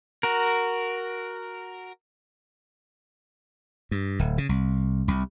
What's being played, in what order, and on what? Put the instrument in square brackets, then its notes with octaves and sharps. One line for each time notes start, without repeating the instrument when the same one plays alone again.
[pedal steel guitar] F#4 A#4
[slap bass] G2
D1
C#3
C2
C2